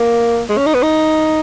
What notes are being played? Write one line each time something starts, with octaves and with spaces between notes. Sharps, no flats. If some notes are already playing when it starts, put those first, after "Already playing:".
Already playing: A#3
G#3
C#4
D#4
B3
D#4